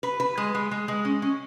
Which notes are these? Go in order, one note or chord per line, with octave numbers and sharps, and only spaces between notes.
B4
B4
G#3
G#3
G#3
G#3
C#4
C#4